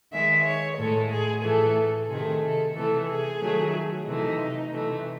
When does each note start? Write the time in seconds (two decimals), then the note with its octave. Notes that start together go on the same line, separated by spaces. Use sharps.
0.12 D#3 G#3 E5
0.45 C#5
0.78 A2 G#3 A4
1.11 G#4
1.43 A2 E3 A3 A4
2.10 C3 D#3 A3 G#4
2.42 A4
2.76 C3 E3 A3 A4
3.08 G#4
3.41 D#3 F#3 A3
4.07 C3 E3 A3 D#4
4.72 C3 E3 A3